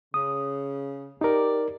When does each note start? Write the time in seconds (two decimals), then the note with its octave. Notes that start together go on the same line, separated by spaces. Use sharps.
0.14 C#3 D#6
1.21 D#4 G4 A#4 D5